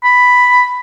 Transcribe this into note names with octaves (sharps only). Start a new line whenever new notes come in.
B5